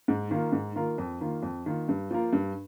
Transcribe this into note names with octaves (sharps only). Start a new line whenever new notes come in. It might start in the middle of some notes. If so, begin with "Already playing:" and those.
G#2
D#3 A#3 F4 A#4
G#2
D#3 A#3 F4 A#4
F2
D#3 A#3 F4
F2
D#3 A#3 F4
G2
F3 A#3 F4 A#4
G2